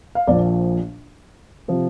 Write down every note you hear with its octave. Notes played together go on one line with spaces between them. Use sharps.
F5
A#1 A#2 F3 D5
C3 F3